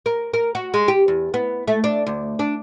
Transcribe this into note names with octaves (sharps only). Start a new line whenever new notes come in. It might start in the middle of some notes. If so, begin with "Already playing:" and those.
A#4
A#4
F#4
G#3
G4
E2
B3
A3
D4
D2
D4